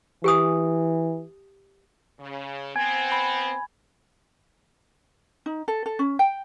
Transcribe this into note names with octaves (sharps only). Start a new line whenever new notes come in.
E3 G4 G#5 D#6
C#3
B3 C4 G#5 G#6
B5
D#4
A4
A4
C#4
G5